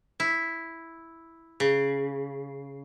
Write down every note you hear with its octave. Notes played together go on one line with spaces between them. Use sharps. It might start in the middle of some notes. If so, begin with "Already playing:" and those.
E4
C#3